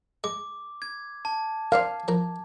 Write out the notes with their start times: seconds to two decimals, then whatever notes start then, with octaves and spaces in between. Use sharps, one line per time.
0.24 G#3 D6
0.82 G#6
1.25 A5
1.72 C4 D4 A#4 F5
2.08 F3 A#4